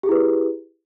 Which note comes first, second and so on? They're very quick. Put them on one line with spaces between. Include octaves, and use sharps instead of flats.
G4 G#4 E4 B4